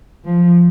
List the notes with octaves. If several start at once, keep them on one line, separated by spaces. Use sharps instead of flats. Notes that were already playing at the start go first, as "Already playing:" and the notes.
F3